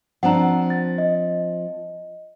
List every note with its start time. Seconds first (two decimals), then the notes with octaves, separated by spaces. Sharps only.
0.23 F3 C4 D4 F#5 A#5
0.70 A6
0.98 D#5